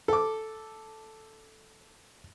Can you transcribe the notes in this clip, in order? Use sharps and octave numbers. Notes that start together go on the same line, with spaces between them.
A4 D6